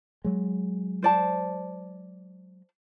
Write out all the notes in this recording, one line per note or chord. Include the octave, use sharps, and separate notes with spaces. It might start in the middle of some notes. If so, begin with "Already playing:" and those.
F#3 G#3
C5 D5 A5